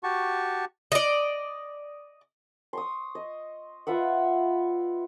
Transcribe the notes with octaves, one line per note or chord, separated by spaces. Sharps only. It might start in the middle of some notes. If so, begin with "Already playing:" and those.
F#4 G4 A5 C#6
D5 D#5
C6 C#6 D#6
D#5
F4 B4 E5 F#5